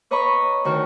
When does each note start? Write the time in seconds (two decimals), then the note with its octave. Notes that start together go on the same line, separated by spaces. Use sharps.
0.11 B4 C#5 D#5 A#5 B5 C#6
0.64 D2 D#3 F#4 A#4